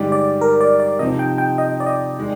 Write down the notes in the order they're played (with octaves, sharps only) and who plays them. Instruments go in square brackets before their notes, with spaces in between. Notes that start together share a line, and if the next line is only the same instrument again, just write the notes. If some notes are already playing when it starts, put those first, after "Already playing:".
Already playing: [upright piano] G2 D3 G#3 D#4 G4 [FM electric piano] D5
[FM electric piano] D5
A#4
D5
D5
[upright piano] C3 F3 C4 D#4 [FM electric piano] D#5
[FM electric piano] G5
G5
D#5
D5
D#5
[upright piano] D#3 G#3